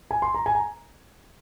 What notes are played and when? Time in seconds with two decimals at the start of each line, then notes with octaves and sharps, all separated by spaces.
0.11 G#5
0.22 C6
0.35 A#5
0.46 G#5
0.55 A#5